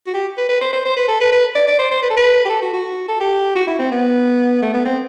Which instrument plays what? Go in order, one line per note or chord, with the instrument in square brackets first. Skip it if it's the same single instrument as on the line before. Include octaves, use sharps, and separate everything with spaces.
[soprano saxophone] F#4
G4
B4
B4
C5
C5
C5
B4
A4
B4
B4
D5
D5
C5
C5
B4
A4
B4
G4
A4
F#4
F#4
A4
G4
F#4
E4
C4
B3
A3
B3
C4